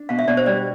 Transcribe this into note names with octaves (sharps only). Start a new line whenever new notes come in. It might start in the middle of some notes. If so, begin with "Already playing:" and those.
Already playing: D4
B2 F5
E5
B2 D5
C5
G3 D5